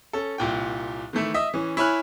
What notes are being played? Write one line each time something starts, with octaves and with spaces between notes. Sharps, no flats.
C#4 A4
C2 A#2 G5
D#3 E3 A3 E4
D#5 E5 D#6
E3 C#4
E4 C#5 G#5 B5 F6 F#6